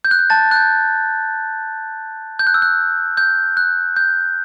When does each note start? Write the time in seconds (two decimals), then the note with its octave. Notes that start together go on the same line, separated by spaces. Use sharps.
0.05 G6
0.11 F#6
0.19 G6
0.30 A5 A6
0.51 F#6
0.56 G6
2.39 G6
2.47 F#6
2.54 E6
2.62 F#6
3.17 G6
3.57 F#6
3.96 G6